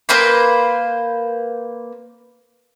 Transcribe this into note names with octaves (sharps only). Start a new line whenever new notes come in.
A#3 B4 C5 B5